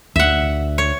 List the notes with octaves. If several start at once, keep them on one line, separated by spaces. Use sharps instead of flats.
D2 E5 F#5
C#5